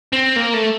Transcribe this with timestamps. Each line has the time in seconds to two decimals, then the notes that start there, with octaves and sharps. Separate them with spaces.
0.12 C4
0.36 A#3
0.53 A3